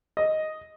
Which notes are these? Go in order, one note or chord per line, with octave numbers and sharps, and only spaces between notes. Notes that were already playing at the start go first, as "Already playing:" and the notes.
D#5